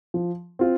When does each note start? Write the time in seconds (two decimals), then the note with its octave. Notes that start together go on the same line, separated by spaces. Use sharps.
0.14 F3
0.59 C4 F4